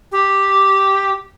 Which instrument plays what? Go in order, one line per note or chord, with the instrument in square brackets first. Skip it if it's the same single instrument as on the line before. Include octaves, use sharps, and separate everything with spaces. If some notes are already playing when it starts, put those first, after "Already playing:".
[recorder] G4